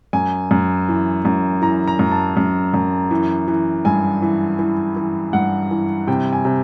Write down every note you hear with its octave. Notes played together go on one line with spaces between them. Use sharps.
F#2 G#5
F#2
E3
F#2
E3 A#5
A#5
F#2
A5
F#2
F#2
E3
E3
G2 G#5
E3
E3
E3
G2 F#5
E3
C3 G5
G#5
C3